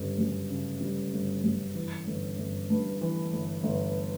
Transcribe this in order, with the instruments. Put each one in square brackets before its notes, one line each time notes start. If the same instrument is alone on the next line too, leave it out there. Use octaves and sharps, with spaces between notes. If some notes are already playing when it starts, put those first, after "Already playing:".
Already playing: [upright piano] G1 C#3 G3
F#2
C#3
G3
G1
F#2
E3
G1
G1
G2
E3
G1
G1